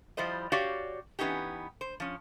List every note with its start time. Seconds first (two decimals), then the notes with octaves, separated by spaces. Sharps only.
0.17 F3 G3 E4 C5 D#5
0.52 F#4 G4 C#5 D5 F5
1.19 E3 B3 C#4 D#4 G4
1.81 C5
2.00 F3 C#4